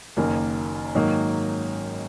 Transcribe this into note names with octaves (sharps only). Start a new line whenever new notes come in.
F#1 F#2 D#3 A#3
G#2 D#3 F#3 A#3 D#4